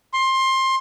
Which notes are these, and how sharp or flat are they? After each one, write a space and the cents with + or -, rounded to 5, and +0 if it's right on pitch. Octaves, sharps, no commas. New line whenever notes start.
C6 +20